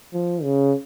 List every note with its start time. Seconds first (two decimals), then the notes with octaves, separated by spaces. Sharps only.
0.13 F3
0.43 C#3